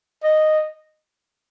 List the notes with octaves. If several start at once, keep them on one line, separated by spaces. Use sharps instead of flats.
D#5